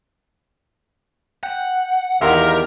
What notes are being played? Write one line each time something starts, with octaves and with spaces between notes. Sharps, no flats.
F#5 G5
E2 D#3 G4 A#4 E5 F5 C6